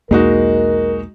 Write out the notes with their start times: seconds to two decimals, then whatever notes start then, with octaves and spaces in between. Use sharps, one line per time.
0.11 B1 E2 G#3 A#3 D#4 F#4 A#4